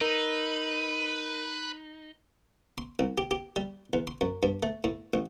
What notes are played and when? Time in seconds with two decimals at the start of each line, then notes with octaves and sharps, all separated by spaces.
0.01 D#4 A#4 B4
2.78 C6
2.99 C2
3.18 G4
3.31 G4
3.56 G3
3.93 E2
4.07 C6
4.21 F#2
4.43 G2
4.63 A3
4.84 A2
5.14 A1